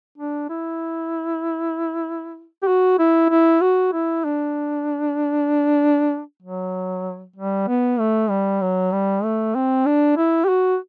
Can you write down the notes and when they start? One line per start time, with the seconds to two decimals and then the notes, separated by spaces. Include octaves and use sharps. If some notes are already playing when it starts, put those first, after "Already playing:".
0.18 D4
0.50 E4
2.63 G4
2.68 F#4
2.99 E4
3.30 E4
3.61 F#4
3.93 E4
4.25 D4
6.42 F#3
7.36 G3
7.68 B3
7.99 A3
8.30 G3
8.61 F#3
8.92 G3
9.24 A3
9.55 C4
9.86 D4
10.17 E4
10.45 G4
10.49 F#4